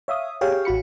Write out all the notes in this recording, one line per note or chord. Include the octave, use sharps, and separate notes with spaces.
C#5 E5 F5 D#6
G4 G#4 C#5 F5 G5
A1 F#4 B5 C#7